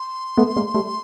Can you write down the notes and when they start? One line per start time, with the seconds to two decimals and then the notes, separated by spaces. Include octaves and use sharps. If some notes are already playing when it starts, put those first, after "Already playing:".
Already playing: C6
0.37 A3 B3
0.56 G#3 A#3
0.74 G3 A3